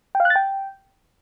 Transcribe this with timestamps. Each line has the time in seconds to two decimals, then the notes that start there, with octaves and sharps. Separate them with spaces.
0.15 G5
0.20 F5
0.25 F#6
0.30 A6
0.36 G5